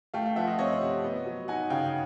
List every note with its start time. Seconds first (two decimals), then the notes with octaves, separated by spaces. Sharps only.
0.14 A3 F5 G5
0.25 F5 G5
0.36 F3 E5 F#5
0.47 D#5 F5
0.59 C4 C#5 D#5
0.82 C3
1.04 B3
1.26 F#3
1.48 D#4 F#5 G#5
1.70 C#3 F5 G5